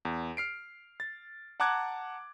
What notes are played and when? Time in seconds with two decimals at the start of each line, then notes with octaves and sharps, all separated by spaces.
0.05 E2
0.37 F6 C7 D7
1.00 A6
1.60 F#5 A5 A#5 D6 F#6 G#6